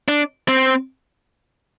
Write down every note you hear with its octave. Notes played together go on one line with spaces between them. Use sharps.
D4
C4